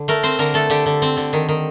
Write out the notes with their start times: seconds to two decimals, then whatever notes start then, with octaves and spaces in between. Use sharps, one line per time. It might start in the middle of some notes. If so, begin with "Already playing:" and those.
Already playing: D3
0.08 A3 A#4
0.23 C4 C5
0.39 D3 A#4
0.54 A3 A4
0.70 D3 G4
0.86 D3
1.02 C4
1.17 D3
1.33 D#3
1.49 D#3